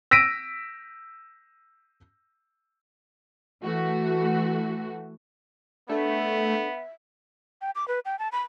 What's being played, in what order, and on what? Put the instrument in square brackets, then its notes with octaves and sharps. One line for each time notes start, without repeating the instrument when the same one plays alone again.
[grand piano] E6 A#6 B6 D7 D#7
[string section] E3 A3 F#4
[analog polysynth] A3 [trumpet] B3 [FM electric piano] D4 A4 [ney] E5
[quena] G5
D6
B4
G5
A5
B5